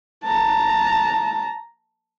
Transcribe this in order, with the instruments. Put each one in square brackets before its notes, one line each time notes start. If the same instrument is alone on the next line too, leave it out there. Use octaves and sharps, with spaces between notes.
[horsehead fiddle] A5 A#5